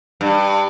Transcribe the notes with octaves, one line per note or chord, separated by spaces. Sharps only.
G2